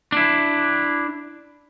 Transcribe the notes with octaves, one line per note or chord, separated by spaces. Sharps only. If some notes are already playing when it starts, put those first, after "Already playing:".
D4 E4